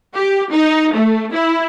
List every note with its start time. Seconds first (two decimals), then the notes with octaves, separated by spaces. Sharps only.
0.14 G4
0.52 D#4
0.94 A3
1.33 E4